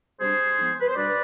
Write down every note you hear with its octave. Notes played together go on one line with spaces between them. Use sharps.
C3 G3 D4 G#4 C5
G#2 F3 B3
B4
C5
B2 G3 D4 B4 D5